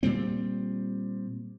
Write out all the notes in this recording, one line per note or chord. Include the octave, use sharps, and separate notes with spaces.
A#2 G3 C4